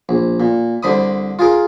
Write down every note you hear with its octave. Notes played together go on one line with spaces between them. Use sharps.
A#1
A#2
C2 D3 C5 B5 D#6
F4 G#4 A#4